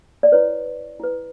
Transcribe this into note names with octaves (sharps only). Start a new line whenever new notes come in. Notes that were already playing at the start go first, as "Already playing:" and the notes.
D5
E4 B4 C#5
E4 B4